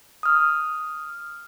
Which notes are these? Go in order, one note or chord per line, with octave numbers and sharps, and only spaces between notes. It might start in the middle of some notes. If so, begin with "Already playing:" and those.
D#6 F6